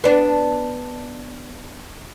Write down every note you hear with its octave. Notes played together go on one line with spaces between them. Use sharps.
B3 D4